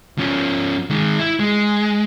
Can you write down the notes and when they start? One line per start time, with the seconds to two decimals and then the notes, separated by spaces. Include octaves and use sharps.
0.18 F3 C#4
0.90 D#3 G#3
1.19 E4
1.39 G#3